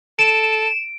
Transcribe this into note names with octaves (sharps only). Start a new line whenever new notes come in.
A4 D7 E7